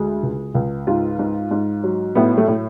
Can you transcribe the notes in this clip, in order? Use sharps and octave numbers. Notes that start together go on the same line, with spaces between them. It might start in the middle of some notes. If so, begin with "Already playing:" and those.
Already playing: D2 G#3
C#2
C#2
G#2 F4
G#2
G#2
F#3
A2 B3
A3
A2